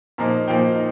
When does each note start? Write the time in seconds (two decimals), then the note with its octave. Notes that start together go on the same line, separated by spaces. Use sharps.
0.18 A#2 F3 A#3 D#4 A#5
0.48 A#2 F3 A#3 D#4 G5
0.76 D#4